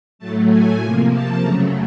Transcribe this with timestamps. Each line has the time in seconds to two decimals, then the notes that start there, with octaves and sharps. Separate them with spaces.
0.19 A2 F#3 A3 A5
0.48 G#5
0.79 C3 F3 A#3 G#5
1.10 A5
1.39 F#2 C#3 F#3 A3 A#5